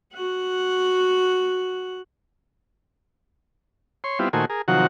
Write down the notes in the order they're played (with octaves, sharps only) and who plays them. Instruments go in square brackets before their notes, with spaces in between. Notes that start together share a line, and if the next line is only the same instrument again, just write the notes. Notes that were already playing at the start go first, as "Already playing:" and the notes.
[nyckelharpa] F#4 F#5
[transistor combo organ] C#5 C6
G3 B3 C4 E4 F4
A#2 D#3 A3 F#4 C5 G#5
G#4 A#4
C3 D#3 F3 F#3 F#4 F#5